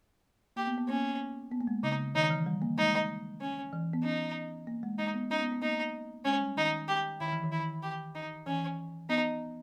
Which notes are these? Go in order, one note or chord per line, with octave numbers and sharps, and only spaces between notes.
A#3 G4
B3
B3
A#3 C#4
B3
A#3
G#3
C#3 D#4
D#3 D#4
E3
G3
A#3
G#3 D#4
C#4
E3
B3
C#4 D#4
A#3
G#3
G#3 D#4
B3
C#4 D#4
B3
B3
A#3 D#4
G#3 C#4
G3
D#3 D#4
G4
D#3 E4
E3
D#3
E4
G4
D#4
E3 C#4
B3 D#4